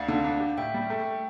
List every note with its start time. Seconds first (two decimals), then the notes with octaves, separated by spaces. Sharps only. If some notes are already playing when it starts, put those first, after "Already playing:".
Already playing: D2 D5 F5
0.08 D3
0.24 D4
0.40 G4
0.57 A2 E5 G5
0.74 G3
0.90 A3